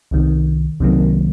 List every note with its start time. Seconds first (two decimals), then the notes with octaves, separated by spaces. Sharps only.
0.11 C2 C3 D#3
0.80 C2 C3 D#3 F#3 A#3